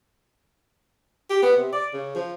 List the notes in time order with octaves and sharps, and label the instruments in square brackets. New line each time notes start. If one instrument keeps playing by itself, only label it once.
[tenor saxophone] G4
B3
C3
D5
C#3
F3